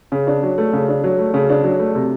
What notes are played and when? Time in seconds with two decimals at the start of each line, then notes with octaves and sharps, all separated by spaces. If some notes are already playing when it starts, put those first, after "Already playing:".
0.12 C#3
0.27 D4
0.43 F#3
0.58 A3
0.73 C#3
0.88 D4
1.04 F#3
1.19 A3
1.34 C#3
1.49 D4
1.64 F#3
1.79 A3
1.95 C3